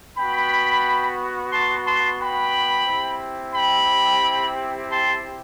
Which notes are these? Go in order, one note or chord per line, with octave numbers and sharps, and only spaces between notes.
B3 F#4 G5 B5
A5 C6
A5 C6
G5 B5
C4 E4 G4
G5 B5
A5 C6